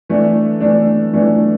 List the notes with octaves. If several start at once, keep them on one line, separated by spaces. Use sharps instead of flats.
E3 A3 D4
E3 A3 D4
E3 A3 D4